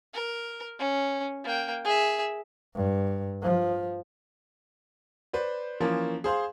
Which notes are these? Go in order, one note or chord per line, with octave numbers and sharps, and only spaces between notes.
A#4
C#4
A#3 G5
G#4 E5
G2
F3
B4 C5 D5
E3 F3 A#3 C#4
G#4 C5 F5 C6